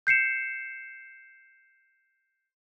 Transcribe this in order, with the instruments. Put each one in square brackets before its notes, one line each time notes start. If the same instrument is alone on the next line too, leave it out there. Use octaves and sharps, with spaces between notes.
[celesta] G6 C7 C#7 E7